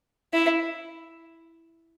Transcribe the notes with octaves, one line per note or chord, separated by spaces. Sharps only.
E4